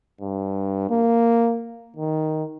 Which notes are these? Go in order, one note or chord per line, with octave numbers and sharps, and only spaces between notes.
G2
A#3
D#3